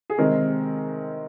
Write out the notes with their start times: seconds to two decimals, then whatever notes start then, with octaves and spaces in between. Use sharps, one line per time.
0.10 G#4
0.18 C3 D#3 G#3 C4 A#4